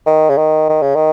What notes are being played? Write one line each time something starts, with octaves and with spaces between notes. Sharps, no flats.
D#3
C#3
D#3
D#3
C#3
D#3